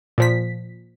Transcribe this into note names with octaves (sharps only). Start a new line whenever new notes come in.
A#2 F3 B6